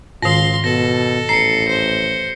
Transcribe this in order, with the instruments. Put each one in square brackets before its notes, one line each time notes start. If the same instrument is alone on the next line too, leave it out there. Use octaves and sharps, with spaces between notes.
[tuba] C#2 [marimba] G#2 D#3 [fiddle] F5 C6 [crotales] A#6
[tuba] B2 [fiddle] A4 [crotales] A#6
[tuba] A1 [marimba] A#5 [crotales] C7 C#7
[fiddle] C5